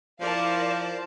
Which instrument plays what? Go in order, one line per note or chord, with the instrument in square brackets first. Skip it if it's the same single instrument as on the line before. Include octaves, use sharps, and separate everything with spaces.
[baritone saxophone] F3 [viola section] E4 A#4 D5 [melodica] C5 [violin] F5 A5